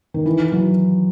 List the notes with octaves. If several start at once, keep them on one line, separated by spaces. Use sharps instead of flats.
D#3
E3
E3 F#3